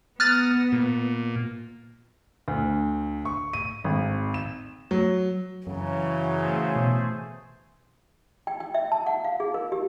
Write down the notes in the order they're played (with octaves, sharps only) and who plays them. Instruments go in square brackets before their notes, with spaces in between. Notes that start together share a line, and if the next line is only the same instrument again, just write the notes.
[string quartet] B3 [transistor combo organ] A#5 D#6 [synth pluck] F6 F#6 A6
[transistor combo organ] A#2
[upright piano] D2
C#6
D#7
G#1
E7
F#3
[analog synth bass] F#2 [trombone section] C#3 F#3 [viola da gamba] E3
[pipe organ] A3 G#4 C5
[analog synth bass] B2
[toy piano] G5
G5
E5
A5
F#5
F5
G#4
A#4
G4